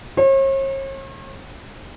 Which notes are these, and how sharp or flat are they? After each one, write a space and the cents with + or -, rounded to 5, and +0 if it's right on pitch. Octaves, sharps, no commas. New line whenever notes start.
C#5 -45